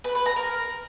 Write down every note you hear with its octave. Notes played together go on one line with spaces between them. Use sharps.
B4
B4
A#5
A#4